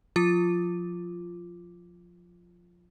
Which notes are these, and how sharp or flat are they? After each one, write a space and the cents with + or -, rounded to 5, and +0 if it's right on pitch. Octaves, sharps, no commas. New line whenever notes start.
F3 +25 F4 -10 D6 +0